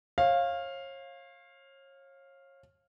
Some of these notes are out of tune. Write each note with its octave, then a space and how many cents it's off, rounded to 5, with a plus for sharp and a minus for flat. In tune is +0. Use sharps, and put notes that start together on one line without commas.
C#5 -35 F5 +0